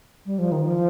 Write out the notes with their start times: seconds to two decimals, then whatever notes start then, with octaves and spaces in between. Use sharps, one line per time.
0.26 G3
0.39 F3
0.52 D#3
0.65 F3